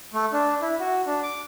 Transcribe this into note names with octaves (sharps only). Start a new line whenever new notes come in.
A3
D4
E4
F#4
D4
D6